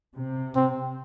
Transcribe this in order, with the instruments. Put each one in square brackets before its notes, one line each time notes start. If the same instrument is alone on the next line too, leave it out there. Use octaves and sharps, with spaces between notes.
[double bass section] C3
[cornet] C4